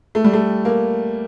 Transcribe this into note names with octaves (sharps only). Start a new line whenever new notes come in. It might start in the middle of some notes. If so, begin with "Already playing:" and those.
A3
G3
A3
A#3